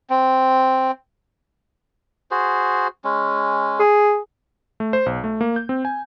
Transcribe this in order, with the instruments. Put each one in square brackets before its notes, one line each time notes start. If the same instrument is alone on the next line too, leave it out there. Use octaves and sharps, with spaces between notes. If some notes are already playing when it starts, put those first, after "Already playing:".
[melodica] C4
F#4 G#4 C5
G#3 C#4
[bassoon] G#4
[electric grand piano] A3
C5
B1
A3
A#3
G6
C4
G#5